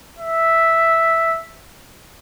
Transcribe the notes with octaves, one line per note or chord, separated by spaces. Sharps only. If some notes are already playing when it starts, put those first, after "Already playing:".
E5